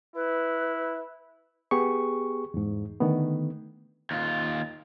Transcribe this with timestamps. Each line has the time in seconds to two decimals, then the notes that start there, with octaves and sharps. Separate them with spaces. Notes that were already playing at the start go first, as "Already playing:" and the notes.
0.15 E4 B4
1.71 B3 G4 G#4 C#6
2.54 E2 G#2
3.00 D3 D#3 A3 B3
4.11 D#2 F4